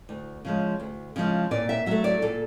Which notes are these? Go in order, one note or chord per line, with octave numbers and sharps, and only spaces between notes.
D2
C#3 F3 G#3
D2
C#3 F3 G#3
A#2 D5
E5
F#3 A3 E5
D5
A#2 A4